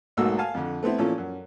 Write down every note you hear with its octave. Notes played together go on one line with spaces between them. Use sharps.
B1 G#2 A3 A#3 F#4 E6
F5 G#5 A5
F2 D3
A3 B3 C4 E4
A#2 E3 F3 C#4 A4
F#2